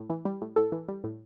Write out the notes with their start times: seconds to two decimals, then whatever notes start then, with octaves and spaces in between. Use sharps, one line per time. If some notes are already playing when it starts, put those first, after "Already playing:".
Already playing: A2
0.10 E3
0.25 G3
0.42 A2
0.56 A2 A4
0.72 E3
0.88 G3
1.04 A2